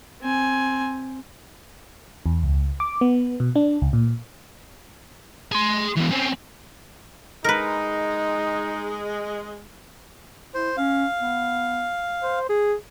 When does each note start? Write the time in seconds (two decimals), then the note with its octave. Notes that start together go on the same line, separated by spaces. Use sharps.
0.21 C4 G#5
2.26 E2
2.43 C#2
2.80 D6
3.01 B3
3.40 B2
3.56 D4
3.82 C#2
3.93 A#2
5.52 G#4 C6
5.97 B2 E3
6.11 C4 C#4
7.44 G#3 D#4 A#4 B4
10.54 E4 C5
10.77 C#4 F5
11.20 B3
12.22 C5
12.49 G#4